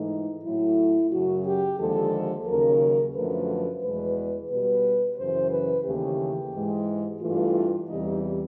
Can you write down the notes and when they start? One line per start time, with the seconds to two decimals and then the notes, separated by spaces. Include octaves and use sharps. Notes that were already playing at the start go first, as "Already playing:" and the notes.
Already playing: G#2 E3 A3 D#4
0.44 A2 F#3 A3 E4
1.11 F#2 C#3 F#3 F#4
1.46 G4
1.80 D#2 D3 F3 G#3 A4
2.47 D#2 C#3 F#3 A#4
3.14 F#2 D3 F3 A3 B4
3.83 E2 B2 G#3 B4
4.50 B2 G3 B4
5.18 F#2 C#3 E3 C5
5.51 B4
5.85 D#2 C#3 E3 A3 G4
6.54 G#2 E3 G#3
7.21 G2 E3 A3 F4
7.88 E2 C3 E3 G3 D#4